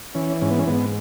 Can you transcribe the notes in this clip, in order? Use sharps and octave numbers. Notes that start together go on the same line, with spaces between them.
E3 C#4
G#2 C#4
B3
C#4
G#2 B3